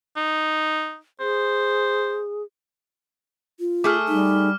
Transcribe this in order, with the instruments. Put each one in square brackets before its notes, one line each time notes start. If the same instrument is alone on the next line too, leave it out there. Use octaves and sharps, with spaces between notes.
[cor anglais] D#4
[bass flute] G#4 [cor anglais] C5
[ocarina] F4
[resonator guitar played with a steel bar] A3 G#4 [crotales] D6 F6
[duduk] G3 [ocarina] D#4